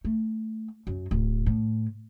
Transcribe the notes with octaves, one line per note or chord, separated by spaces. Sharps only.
A3
F#2
D1
A2